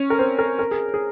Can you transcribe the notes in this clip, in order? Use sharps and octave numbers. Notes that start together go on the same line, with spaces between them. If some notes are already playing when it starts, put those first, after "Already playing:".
Already playing: C#4 C#5
A#4
C4 C5
A#4
A#4
G#4
G#4